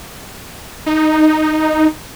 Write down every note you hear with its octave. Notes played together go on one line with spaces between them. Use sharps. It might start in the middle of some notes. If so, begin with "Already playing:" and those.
D#4